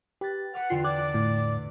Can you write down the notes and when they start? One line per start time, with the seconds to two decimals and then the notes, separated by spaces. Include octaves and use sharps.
0.21 G4 B4 A6
0.54 B4 F#5 D6 F6
0.70 E2 D3 F4 G5 C7
0.85 D5 D6 F#6 G#6
1.14 A2